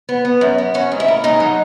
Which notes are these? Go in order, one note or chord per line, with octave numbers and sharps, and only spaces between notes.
B3
B3
F#2
B3
C#4 F#4
G#2
E4
A#3
G#2 D#4
F#3